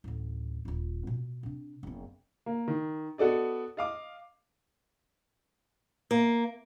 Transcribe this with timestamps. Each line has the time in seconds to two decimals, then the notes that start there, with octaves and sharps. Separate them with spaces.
0.04 A1 D2
0.65 D#1 F4
1.07 B2
1.43 C3 D4
1.83 F#1 B3
2.46 A#3
2.68 D#3
3.18 B3 F#4 A4 D5 D#5
3.77 D#5 F5 D6
6.11 A#3